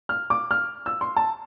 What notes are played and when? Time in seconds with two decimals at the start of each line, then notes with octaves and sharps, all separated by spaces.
0.09 F6
0.30 D6
0.51 F6
0.86 E6
1.01 C6
1.16 A5